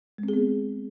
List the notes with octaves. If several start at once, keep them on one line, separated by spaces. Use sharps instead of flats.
G#3
C4
G#4
B3